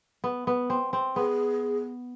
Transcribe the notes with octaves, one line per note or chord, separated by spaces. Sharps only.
B3
B3
C4
C4
B3 G#4